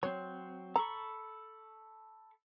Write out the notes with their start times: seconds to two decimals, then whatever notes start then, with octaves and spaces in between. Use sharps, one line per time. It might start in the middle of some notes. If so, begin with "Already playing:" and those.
0.03 F#3 C4 C#5
0.76 A4 A#5 B5 C#6